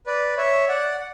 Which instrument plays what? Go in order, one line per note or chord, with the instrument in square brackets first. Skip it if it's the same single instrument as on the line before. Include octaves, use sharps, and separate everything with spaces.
[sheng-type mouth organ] B4 D5
C#5 E5
D5 F#5